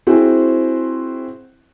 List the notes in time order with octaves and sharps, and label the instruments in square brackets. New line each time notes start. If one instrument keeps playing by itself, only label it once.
[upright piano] C4 E4 F#4 G#4 C5